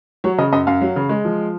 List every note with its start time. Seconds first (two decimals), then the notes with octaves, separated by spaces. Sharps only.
0.24 F#3 C#5
0.38 C#3 D#5
0.53 F#2 D#5
0.67 F#2 F5
0.81 F#3
0.96 C#3
1.09 G#3
1.25 F3